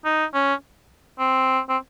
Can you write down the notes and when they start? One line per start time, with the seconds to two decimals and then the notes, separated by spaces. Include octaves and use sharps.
0.05 D#4
0.34 C#4
1.19 C4
1.69 C4